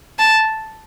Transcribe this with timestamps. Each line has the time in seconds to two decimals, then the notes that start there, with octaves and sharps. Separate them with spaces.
0.19 A5